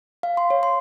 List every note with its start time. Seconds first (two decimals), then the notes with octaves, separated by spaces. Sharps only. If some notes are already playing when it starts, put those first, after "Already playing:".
0.23 F5
0.37 C6
0.50 C#5
0.63 C6